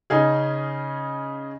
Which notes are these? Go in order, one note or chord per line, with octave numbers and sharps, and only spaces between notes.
C#3 C#4 D#4 G#4